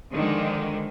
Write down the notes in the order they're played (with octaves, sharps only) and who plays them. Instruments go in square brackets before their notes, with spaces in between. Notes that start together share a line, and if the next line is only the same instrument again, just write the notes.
[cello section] D3 D#3 F3 G#3